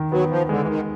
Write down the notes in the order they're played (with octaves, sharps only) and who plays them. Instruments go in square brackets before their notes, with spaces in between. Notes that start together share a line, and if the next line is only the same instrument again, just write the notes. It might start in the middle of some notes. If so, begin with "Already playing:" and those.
Already playing: [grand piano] D#3
[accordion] F#3 [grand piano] B3
[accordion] F3
[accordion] D3 [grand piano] G#3
[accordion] E3
D#3